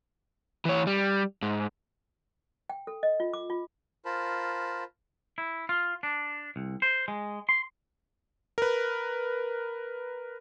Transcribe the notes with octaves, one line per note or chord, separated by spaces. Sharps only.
E3 C#5
G3
G#2
G5
A4
D#5
F4
D6
F4
F4 A#4 C5 A5 B5
E4
F4
D4
C2
C5
G#3
C6
A#4 B4